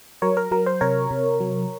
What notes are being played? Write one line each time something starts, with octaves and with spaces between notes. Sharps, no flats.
F#3 A#4 C#5
A#4
F#3 A#4
C5
C3 A#4 C#5
C3
F#3